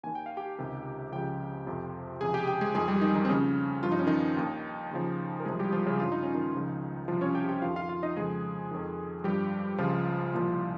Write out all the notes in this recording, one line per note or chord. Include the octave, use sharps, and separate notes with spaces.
D#2 D#3 G#5
G5
F5
G4 G5
C#2 C3 D#3
C#2 C#3 F3 G4 G5
F2 C3 F3
C#2 C3 F3 G#4 G#5
G4 G5
G4 G5
G#3 G#4
F2 D#3 G#3 G#4
G3 G4
D#3 D#4
D#3 D#4
C4
D#2 C#3 F3 C#4
G2 F3 F4
D#4
C#4
D#3 D#4
D#2 D#3
D#2 C#3 F3
A#4
C2 C3 F3 G#3 G#4
G3 G4
F3 F4
C#3 C#4
G2 F3 F4
D#4
C#4
D#3 D#4
C#2 C#3 F3
C2 C3 F3 F4
C#4 C#5
G4 G5
G4 G5
F2 D#3 F4 F5
F4 F5
F4 F5
D#4 D#5
F2 C#3 F3 G#3 G#4
F2 D#3
G2 F3 G3 G4
C#2 C#3 F3 F4
C2 A#2 F3